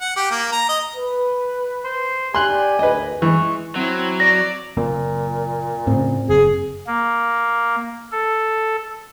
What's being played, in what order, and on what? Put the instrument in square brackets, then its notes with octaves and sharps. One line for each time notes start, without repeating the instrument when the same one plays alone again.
[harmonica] F#5
G4
A#3
A#5
D#5
[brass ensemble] B4
[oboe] C5
[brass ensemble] G4 D5 [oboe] G#5 [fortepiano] C6 F#6
[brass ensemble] G#1 D2 A2 [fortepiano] B4 D#5
[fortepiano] E3 [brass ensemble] G#3 [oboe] C#6
[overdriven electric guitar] F#3 [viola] C4 E4
[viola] D5 [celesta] A#6
[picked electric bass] F#1 A#3 C4 [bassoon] A#2
[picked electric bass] A2 C#3 [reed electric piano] C4
[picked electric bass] F#1 [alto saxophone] G#4
[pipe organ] A#3
A4